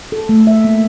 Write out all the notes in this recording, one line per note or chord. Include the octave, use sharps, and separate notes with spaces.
A4
A3
E5
A#3